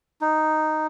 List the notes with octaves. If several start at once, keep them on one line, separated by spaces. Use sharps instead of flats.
D#4